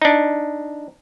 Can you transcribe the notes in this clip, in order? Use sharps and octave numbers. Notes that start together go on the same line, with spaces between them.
D4 D#4